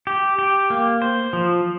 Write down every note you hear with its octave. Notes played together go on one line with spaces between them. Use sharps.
G4
G4
A#3
C5
F3